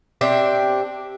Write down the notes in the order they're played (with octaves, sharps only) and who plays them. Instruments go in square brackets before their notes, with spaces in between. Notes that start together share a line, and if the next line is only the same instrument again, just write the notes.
[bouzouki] C4 D4 G4 E5